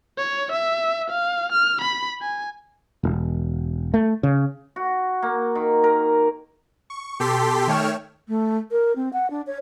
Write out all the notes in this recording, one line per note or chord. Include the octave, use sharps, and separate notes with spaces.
C#5
E5
F5
F6
B5
G#5
E1
A3
C#3
F#4
A#3
D#3
A#4
C#6
B2 G4 A4 C6 B6
D#3 A3 C#5 G5 F6 E7
A3
A#4
C4
F#5
D4
C#5